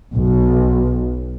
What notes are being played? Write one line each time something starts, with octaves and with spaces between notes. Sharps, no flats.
B1